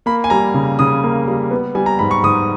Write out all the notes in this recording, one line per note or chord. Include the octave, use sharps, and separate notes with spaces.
A#3 B5
G#5
G3 A#5
C#3
C#3 D#6
A#3
G3
B3
G3 G#5
A#5
G#2 B5
C#6
G#2 D#6